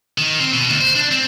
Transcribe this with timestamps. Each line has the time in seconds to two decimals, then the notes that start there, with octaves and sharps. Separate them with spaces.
0.18 D#3
0.40 C4
0.53 B2
0.69 D2
0.81 C5
0.96 D4
1.11 C4